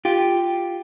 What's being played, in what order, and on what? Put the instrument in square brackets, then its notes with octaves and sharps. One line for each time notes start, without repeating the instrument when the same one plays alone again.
[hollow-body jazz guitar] F4 G4